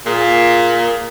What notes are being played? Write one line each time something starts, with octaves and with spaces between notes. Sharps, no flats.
A#2 G#4